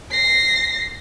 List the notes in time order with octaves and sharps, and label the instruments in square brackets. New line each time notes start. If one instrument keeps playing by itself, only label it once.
[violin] A#6 C7